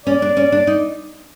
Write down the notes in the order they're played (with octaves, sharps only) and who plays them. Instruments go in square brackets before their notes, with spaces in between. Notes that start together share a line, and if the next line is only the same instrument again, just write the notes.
[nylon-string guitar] C#4 [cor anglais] D5
[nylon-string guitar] D4
C#4
D4
D#4